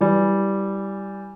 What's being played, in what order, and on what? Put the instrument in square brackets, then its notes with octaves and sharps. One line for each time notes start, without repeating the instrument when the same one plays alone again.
[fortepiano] E3 G3